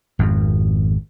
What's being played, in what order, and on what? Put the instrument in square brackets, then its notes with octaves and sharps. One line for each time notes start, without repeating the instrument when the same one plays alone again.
[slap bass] G#1 F2